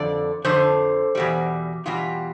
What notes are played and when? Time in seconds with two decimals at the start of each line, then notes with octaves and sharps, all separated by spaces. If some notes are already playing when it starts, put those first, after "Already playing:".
Already playing: F2 D3 F3 D5
0.45 F2 D3 F3 C5
1.15 E2 B2 G3
1.86 E2 B2 G3 F4